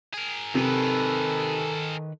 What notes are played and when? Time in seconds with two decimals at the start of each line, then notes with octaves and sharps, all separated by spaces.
0.14 G#4 A#4
0.55 C3 D#3 A4 B4